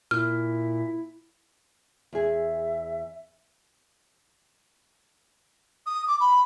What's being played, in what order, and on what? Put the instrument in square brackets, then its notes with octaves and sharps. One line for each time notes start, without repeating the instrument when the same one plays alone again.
[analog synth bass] A#2 [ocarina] E4 [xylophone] F6
[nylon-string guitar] E2 G#4 [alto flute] E5
[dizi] D#6
D6
B5